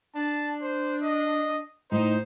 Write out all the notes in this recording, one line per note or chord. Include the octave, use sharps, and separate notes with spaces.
D4 A5
C5
D#5
A2 D#4 C5